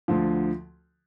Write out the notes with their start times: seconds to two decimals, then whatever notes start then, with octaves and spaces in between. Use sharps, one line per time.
0.08 D2 D3 F3